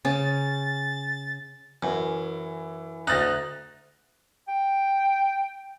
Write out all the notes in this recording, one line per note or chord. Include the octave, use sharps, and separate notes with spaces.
C#3 C#4 A6
F#2 E3
D2 D#4 F#6 A6 A#6
G5